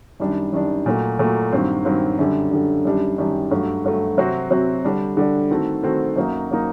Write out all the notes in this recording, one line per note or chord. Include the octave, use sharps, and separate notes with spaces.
F#2 D#3 G3 D4
F#2 D#3 G3 D4
A#2 F#3 A3
A#2 F#3 A3
G2 D#3 F#3 C4
G2 D#3 F#3 C4
F#2 D3 G3
F#2 D3 G3
F#2 D#3 G3 D4 G4
F#2 D#3 G3 D4 G4
G2 F#3 A3
G2 F#3 A3
C3 F#3 C4 F#4
C3 F#3 C4 F#4
D3 G3 D4
D3 G3 D4
D#3 A3 C4 F#4 A4
D#3 A3 C4 F#4 A4
F#2 F#3 A#3 D#4
F#3 A#3 D#4